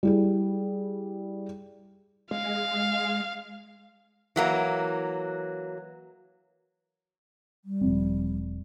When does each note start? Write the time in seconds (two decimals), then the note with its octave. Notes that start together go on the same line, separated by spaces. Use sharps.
0.03 G3 E4 G#4
2.31 G#3 F5
4.36 E3 F#3 A#3
7.65 G3
7.81 E1 F3 C4